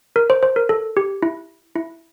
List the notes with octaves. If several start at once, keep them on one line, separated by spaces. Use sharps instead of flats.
A#4
C5
C5
A#4
A4
G4
E4
E4